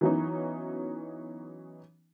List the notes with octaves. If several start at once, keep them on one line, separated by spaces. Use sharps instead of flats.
E3 F#3 B3 C#4 D#4